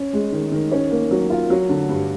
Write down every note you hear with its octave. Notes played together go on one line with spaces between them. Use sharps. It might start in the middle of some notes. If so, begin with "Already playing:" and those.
Already playing: C#4
G#3
D#3
D#3
C#4
A#3
F#3
F4
F#3
D3
G2